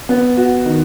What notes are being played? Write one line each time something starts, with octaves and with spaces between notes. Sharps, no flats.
B3
F#4
D#3